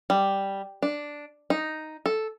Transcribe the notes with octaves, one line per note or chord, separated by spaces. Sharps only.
G3
D4
D#4
A4